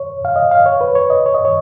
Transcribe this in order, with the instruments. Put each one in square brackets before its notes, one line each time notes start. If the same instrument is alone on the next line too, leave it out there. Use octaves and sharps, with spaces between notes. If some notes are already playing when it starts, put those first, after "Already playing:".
Already playing: [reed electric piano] C#5
F5
D#5
F5
C#5
B4
C#5
D#5
C#5
D#5
C#5